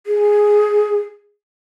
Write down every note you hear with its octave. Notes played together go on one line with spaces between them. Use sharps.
G#4